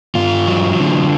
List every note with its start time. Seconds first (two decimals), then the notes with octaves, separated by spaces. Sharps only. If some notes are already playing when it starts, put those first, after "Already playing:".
0.15 G2 F4
0.48 F#3
0.80 D3